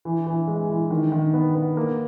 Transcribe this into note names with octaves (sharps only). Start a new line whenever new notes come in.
E3
E3
G#3
E3
D#3
D#3
B3
B3
A#3